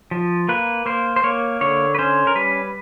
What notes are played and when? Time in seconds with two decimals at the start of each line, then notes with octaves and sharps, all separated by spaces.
0.11 F3
0.49 A#3 B4
0.86 A#3 C5
1.16 C5
1.24 A#3 C#5
1.61 D3 C#5
1.95 B4
1.99 C#4 C5
2.27 A#4
2.35 G3 B4